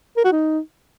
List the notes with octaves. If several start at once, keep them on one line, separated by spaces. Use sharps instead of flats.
A#4
F#4
D#4